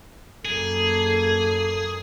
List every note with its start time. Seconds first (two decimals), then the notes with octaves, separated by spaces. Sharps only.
0.45 F#2 A#3 G#4 A4